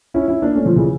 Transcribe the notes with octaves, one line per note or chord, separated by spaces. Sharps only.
C#4 E4
C#4 E4
A#3 D4
A3 C#4
D3 F3
C#3 E3